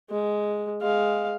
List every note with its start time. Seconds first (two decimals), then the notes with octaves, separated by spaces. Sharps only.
0.10 G#3
0.82 G#3 F5